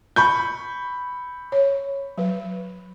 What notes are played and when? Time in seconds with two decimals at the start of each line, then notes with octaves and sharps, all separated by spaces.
0.16 B5 C#6 G6
1.52 C#5
2.18 F#3 B4